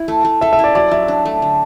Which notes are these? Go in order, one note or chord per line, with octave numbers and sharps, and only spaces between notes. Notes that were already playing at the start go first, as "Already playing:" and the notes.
Already playing: E4
A3
A3
A4 E5
E5
E4 D5
F#3 D5
F#3 E5
D4
A3
D3